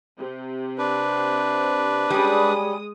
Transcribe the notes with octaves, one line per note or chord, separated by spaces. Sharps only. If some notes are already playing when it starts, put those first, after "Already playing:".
C3
D4 B4
G3 G#3 C#4 D#6